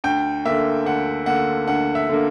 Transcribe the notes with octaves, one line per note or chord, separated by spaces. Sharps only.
D2 G5
D3 A#3 E5
D2 F#5
D3 A#3 F#5
D2 F#5
E5
D3 A#3